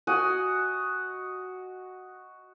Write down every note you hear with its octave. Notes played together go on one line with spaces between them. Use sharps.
F#4 D#5 F#5 G#5